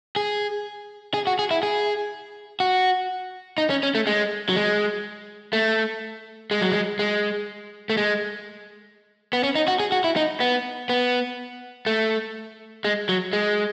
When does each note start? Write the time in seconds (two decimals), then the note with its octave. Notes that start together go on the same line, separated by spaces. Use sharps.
0.16 G#4
1.14 G#4
1.27 F#4
1.39 G#4
1.51 E4
1.63 G#4
2.60 F#4
3.58 D#4
3.70 C#4
3.83 C#4
3.95 A3
4.07 G#3
4.49 F#3
4.56 G#3
5.53 A3
6.51 G#3
6.61 F#3
6.72 G#3
6.99 G#3
7.90 A3
7.97 G#3
9.33 B3
9.44 C#4
9.55 D#4
9.68 F#4
9.80 G#4
9.92 F#4
10.04 E4
10.16 D#4
10.40 B3
10.89 B3
11.86 A3
12.85 G#3
13.09 F#3
13.33 G#3